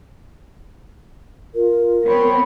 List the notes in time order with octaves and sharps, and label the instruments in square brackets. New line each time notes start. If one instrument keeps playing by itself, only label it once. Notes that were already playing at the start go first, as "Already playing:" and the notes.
[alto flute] F4 [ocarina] A#4
[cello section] B3 C4 C#5 [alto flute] B5